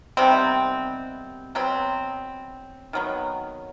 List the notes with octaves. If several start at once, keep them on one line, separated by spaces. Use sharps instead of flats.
C3 D#3 G3 B3 C4
B2 F#3 B3 C4
D#3 F#3 B3